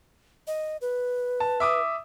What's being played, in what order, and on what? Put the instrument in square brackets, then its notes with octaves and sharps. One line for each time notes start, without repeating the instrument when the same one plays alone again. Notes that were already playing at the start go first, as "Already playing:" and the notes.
[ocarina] D#5
B4
[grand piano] A5
E5 D6 D#6